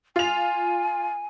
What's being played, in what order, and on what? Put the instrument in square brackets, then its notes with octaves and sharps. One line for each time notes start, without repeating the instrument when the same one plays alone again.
[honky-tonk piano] F4 F7 [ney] G#5